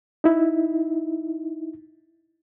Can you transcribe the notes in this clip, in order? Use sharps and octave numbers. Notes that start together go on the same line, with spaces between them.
D#4 E4